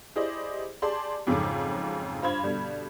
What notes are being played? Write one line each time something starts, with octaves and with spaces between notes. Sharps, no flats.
E4 G4 G#4 C5 D5 D#5
G4 G#4 D5 A5 C6
F2 G#2 C#3 F#3 A4 D6
G2 F4 C5 B5 G#6
G2 B2 D3 G3